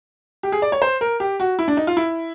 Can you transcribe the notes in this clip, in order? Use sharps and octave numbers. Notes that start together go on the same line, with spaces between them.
G4
G#4
D5
C#5
C5
A#4
G4
F#4
E4
D4
D#4
F4
E4